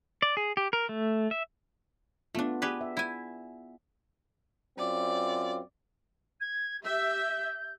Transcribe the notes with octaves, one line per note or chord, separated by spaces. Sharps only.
D5
G#4
G4
A#4
A3
E5
A3 B3 D4 F4
G4 G#4 B4 D5
E5
E4 G#5
F#2 C4 F4 D5
G#6
G4 E5 G6